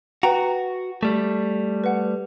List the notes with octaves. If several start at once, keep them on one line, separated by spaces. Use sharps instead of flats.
F#4 B4 G5 A#5
G3 A3
B4 F#5